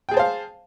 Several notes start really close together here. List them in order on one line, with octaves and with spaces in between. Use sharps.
G5 G#4 A5 C5 F5